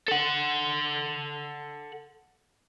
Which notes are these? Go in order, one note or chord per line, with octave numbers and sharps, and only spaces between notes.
A4 F#5